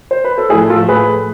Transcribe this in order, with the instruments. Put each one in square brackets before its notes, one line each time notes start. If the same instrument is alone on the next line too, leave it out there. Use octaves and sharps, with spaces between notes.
[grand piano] C5
B4
A4
[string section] A2 F3 A3 [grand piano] E4 G#4
[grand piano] F4 A4
G#4 B4